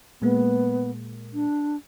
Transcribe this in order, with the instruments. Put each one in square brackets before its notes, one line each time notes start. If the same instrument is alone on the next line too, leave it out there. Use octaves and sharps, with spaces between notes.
[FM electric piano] A#2 G#3 A#3 [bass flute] B3
[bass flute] D4